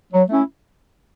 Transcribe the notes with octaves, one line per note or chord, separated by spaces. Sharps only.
F#3
A3 C#4 E4